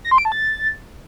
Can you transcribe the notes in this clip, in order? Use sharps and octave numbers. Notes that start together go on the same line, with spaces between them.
A#6
C6
D7
A5
A6